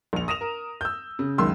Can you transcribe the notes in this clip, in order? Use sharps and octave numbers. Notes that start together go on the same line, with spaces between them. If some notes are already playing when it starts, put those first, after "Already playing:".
A#1 F7
D#6 A#6 E7 F7
A#4
E6 G6
C#3
C#2 F#2 D#3 C6 E6